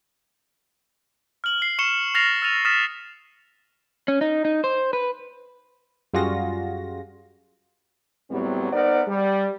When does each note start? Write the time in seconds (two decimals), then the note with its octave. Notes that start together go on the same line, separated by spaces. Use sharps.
1.44 F6 F#7
1.62 C7
1.79 C#6 C#7 E7 G7
2.14 F6 A6 A#6 C7 F7
2.42 E6 F6 A6 D#7 F7
2.65 D#6 F6 A6 B6 E7
4.08 C#4
4.21 D#4
4.45 D#4
4.64 C5
4.93 B4
6.13 F#2 G3 F4 F#4 G#4 A#6
8.30 E2 A2 F#3 G3 B3 C4
8.71 B3 D#4 A#4 C5 D5 F#5
9.08 G3